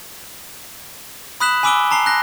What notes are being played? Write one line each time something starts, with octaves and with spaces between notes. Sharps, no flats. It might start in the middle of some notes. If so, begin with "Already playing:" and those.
B5 D#6 F#6 B6 E7 F#7
G#5 B5 D6 E6 D7 G7
A5 A#5 C7 G7
F#6 A#6